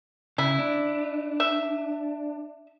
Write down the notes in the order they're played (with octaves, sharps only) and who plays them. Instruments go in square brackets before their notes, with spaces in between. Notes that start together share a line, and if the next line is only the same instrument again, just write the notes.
[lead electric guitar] C#3 [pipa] E4
[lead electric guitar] D4
[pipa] E5